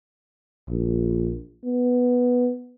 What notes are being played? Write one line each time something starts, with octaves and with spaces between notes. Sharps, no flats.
A#1
B3